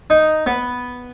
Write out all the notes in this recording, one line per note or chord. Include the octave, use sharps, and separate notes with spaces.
D#4
B3